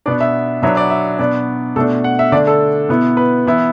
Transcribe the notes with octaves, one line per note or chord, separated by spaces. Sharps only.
B2 B3 D4 D5
E5
B2 F#3 B3 D4 E5
D5
E5
B2 B3 D4 D5
B2 A3 D4 A4
F#5
E5
D3 A3 D4 D5
A4
B2 B3 E4
B4
E3 B3 E4